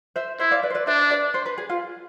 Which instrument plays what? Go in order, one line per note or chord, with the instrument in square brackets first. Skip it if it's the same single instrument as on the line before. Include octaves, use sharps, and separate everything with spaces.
[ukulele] C5 E5
[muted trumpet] E4 [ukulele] C5 E5
[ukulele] D5 F5
B4 D5
C5
B4 D5
[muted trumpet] D4 [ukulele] C5 E5
[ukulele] B4 D5
C5
B4
G#4
F4